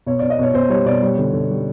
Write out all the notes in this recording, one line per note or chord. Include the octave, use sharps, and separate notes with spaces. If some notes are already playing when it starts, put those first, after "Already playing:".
B2 C#5
B2 D5
D#5
B2 C#5
B2 C5
G3 C#5
B2 D5
G3 C#5
D3
D3
G3